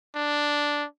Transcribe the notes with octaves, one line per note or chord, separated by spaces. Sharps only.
D4